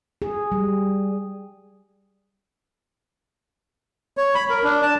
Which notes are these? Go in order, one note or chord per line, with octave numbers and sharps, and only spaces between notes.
G#4
G3
C#5
B5
A#4
D4
A5